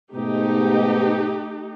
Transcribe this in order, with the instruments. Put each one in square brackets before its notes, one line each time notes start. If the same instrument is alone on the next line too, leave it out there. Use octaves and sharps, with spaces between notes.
[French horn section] G#2 B2 B3 [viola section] A3 D#4 G4